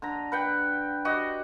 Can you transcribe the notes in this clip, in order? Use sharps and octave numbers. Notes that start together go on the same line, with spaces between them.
D3 A#5
B4 F#5 G5
F#4 G4 D#5